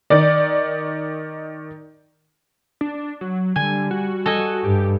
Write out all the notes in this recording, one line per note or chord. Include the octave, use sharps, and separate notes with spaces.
D#3 D5
D4
F#3
D3 G3 G#5
F#4
A4 D#5 G#5
G2 G4